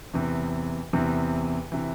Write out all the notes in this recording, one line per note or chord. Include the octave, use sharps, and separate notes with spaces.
E2 C3 E3
E2 C3 E3
C3 E3